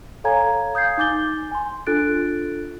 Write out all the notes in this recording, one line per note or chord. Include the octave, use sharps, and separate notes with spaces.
A4 C#5 F5 G#5 A#5 G#6
F5 D#6 G6 G#6 C7
D#4 G#5 D6 G6 A6 G7
G#5 C6
D4 F4 A4 F#6 A6 D7